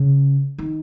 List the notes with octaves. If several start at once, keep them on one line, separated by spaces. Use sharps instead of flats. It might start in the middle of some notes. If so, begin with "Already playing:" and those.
Already playing: C#3
D#3